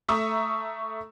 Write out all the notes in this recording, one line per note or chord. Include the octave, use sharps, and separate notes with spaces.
A3 E5 A#5 C#6 D#6 E6